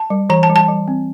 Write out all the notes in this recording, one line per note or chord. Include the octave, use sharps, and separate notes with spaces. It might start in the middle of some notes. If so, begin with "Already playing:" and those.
Already playing: A5
G3
E3 A#5
A5
G3
A5
G3
C4